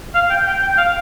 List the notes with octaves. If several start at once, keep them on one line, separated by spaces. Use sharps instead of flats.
F5
G5
G5
G5
F5